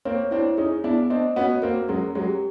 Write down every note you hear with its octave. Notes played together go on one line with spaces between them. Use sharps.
A#3 C4 C#5
C4 D4 E4
C#4 D#4 G#4
B3 D4 E4
C4 D4 D#5
B3 C#4 F#4
A#3 C4 A#4
F#3 G#3 C#4
F#3 G#3 G4